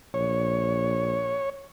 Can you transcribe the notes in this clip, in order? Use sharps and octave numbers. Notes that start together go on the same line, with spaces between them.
A#1 C#5